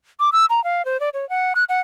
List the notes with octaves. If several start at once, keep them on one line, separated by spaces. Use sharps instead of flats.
D6
E6
A#5
F5
C5
D5
C#5
F#5
F#6
F#5